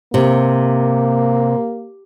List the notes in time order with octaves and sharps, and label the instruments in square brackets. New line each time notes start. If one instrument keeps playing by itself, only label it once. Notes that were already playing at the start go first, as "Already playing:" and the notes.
[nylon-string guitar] C3 [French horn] A#3